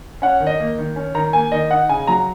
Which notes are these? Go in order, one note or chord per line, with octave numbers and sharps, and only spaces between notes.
C#4 F#5
D#3
D#5
A#3
D#3
C#4
D#3 A#5
A#3 G#5
D#3 D#5
D#4 F#5
C#3 G#5
F#3 A#5